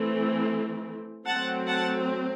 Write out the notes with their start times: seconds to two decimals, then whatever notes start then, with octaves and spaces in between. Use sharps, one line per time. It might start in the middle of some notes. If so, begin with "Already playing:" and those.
Already playing: E3 A3 C4
1.26 F#3 A3 C4 F#5 A5
1.68 F#5 A5